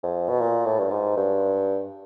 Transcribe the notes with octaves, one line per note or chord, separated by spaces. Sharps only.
F2
B2
A#2
A2
G2
G#2
G2